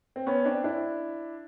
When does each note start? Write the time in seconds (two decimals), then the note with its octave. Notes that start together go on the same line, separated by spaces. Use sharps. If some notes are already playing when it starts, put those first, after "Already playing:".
0.16 C4
0.26 B3 C#4
0.45 C4 D4
0.64 D4 E4